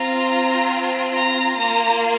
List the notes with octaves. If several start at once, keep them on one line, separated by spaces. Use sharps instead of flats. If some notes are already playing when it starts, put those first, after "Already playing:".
Already playing: C4 F4 A#5
A#5
A#3 F4 A#5